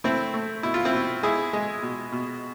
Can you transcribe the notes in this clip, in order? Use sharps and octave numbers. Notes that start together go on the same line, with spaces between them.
A3 C4 E4
A3
B2 E4
F4
C4 E4
B2
G#3 E4 G#4
G#3
B2
B2